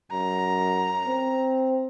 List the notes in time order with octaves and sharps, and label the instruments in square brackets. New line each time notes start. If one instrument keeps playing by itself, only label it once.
[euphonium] F#2 [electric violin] A#5
[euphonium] C4